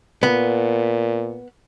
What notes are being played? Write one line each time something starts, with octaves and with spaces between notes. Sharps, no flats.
A#2 B3